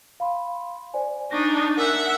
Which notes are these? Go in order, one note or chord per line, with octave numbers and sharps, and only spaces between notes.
F5 B5 C6
C5 D5 G#5
D4 D#4 C#6 A#6
A#4 E5 F#5 G#5